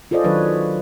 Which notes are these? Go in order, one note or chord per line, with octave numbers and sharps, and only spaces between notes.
F4 G#4 A4 C5 D5 D#5
D#3 F#3 D4 B4 C#5